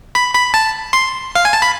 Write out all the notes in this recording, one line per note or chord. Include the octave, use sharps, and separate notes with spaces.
B5
B5
A5
C6
F5
G#5
A5
B5